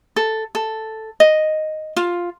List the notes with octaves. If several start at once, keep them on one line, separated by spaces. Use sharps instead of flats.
A4
A4
D#5
F4